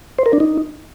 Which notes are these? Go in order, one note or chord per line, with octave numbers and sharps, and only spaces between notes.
C5
A#4
D4
D#4